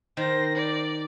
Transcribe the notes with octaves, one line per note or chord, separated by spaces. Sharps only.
D#3 C5 A#6
D5